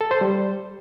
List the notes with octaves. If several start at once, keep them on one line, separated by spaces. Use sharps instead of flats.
A4
C5
G3